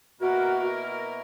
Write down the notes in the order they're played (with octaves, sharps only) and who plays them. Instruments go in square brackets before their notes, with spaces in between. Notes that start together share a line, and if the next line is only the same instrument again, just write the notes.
[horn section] B2 A#3 E4 A#4 [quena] F#4